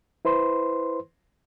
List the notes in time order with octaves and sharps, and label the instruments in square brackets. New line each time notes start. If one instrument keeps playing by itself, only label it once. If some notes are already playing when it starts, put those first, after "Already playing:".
[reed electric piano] E4 B4 C5 C6